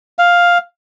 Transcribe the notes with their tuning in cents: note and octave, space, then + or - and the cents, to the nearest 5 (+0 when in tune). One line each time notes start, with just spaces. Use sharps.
F5 +5